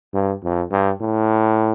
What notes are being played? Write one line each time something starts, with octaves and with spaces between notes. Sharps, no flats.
G2
F2
G2
A2